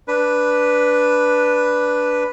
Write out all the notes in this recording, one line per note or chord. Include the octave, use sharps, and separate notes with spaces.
D4 B4